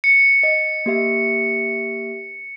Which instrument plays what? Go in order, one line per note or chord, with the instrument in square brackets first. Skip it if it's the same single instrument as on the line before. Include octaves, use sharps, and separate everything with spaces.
[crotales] C#7
[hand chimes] D#5
A#3 G4 E5